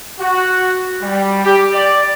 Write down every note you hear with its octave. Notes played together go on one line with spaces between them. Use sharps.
F#4
G3
G4
D5